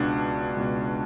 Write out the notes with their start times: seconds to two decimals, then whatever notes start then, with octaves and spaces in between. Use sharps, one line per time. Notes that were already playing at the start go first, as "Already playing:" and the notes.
Already playing: C#2 B2 D4
0.56 C#2 B2